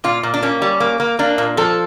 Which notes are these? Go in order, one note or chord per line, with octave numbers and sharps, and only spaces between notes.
A#2 F4
A#2
D4
A#3 C#4
G3
A#3
A#3
A#3 D4
A#2
F3 A4